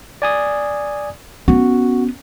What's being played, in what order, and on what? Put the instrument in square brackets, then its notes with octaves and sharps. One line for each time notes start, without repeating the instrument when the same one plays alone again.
[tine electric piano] D5 G#5 D#6
[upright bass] B3 C#4 [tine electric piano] F#4